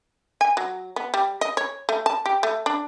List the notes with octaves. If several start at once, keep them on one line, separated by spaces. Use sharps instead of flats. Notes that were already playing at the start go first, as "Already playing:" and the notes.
G#5
F#3
B3
G3
D#5
C#5
A3
A5
G4
A3
D4